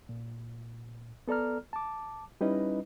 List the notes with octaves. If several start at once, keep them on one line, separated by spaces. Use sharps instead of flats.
A#2
B3 A4 D5 A#5 F6
A5 D6
G3 C#4 D#4 E4 B4 D#5